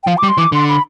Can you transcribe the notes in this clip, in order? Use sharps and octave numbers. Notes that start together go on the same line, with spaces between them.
G5
F3 F5
D6
G3
C6
E3 D6
D3 C6
B5